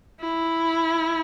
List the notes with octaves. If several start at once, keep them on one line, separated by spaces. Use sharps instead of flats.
E4